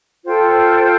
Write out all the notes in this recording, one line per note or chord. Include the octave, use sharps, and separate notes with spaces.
F4 A4 C5 G5